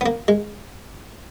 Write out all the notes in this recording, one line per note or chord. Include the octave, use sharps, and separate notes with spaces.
B3
A#3
G#3